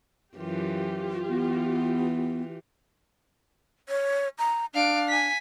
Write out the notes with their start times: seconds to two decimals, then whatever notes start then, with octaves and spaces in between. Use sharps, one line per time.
0.37 F#2 E3 F4 G4
1.29 E3 B3
3.89 C#5
4.38 A#5
4.74 D4 F5 D7
5.08 G#5 B6